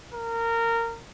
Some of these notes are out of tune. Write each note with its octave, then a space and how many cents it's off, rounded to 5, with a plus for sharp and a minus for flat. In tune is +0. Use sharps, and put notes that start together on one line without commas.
A#4 -20